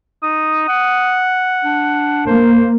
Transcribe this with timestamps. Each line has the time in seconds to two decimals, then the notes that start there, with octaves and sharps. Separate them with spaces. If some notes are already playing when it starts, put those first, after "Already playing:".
0.23 D#4 D#6
0.68 F#5
1.65 D4
2.26 A#3 C5